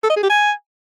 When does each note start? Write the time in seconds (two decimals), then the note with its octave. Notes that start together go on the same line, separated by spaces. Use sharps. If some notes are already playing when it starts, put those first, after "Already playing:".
0.03 A4
0.09 D#5
0.16 G#4
0.23 G4
0.29 G#5